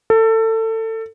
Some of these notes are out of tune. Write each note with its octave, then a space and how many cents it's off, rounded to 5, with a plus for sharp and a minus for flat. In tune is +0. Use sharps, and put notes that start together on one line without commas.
A4 +25